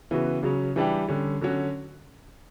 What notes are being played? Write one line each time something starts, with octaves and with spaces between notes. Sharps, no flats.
C#3 E3 B3 F#4
C#3 F#3 C#4
E3 G3 D4 G4
D3 G3 C#4
D3 F#3 C#4 F#4